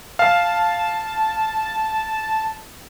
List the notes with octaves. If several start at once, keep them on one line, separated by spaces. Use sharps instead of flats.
F5 A5